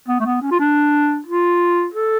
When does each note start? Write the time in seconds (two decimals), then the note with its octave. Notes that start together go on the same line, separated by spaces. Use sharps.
0.08 B3
0.20 A3
0.26 B3
0.42 C#4
0.51 F4
0.59 D4
1.26 F4
1.94 A4